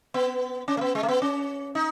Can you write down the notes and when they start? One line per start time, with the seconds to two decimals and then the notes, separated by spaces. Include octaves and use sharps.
0.14 B3
0.68 C#4
0.77 A3
0.81 B3
0.95 G#3
1.03 A3
1.08 B3
1.22 C#4
1.75 D#4